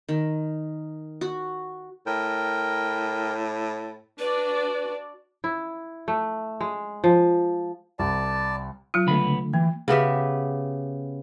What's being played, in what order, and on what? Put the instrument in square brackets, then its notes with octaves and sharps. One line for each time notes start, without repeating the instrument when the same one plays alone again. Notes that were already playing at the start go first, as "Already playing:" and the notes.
[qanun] D#3
F#4
[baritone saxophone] A2 [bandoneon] A#4 G5
[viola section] D4 F#4 D5 [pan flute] B4
[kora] E4
A3
G#3
F3
[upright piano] C2 [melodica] D5 A5
[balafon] F#3 F4
[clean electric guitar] C#2 B3 B5 [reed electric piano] D3 A3
[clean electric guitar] E3 [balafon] A#3
[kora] C#3 B3 G4 E5